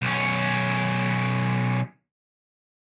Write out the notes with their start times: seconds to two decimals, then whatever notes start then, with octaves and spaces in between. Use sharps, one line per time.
0.02 B1 C#4